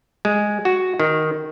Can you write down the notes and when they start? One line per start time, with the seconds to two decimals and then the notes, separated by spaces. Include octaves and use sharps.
0.25 G#3
0.65 F#4
1.00 D#3